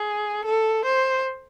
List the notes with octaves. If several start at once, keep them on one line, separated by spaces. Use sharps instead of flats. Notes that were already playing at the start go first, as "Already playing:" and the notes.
Already playing: G#4
A4
C5